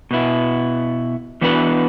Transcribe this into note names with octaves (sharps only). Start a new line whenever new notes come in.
B2 B3 E4
E3 B3 D4 F#4 B4